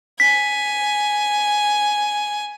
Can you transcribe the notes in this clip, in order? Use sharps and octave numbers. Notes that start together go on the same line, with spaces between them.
G#5 B6